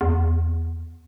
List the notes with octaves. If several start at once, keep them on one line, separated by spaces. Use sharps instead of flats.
E2